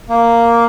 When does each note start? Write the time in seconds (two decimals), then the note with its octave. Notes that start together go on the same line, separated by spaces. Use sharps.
0.09 A#3